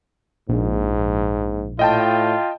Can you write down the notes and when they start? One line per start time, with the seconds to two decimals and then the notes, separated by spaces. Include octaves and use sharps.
0.49 A#1 G#2
1.79 A2 F4 D#5 G5 A5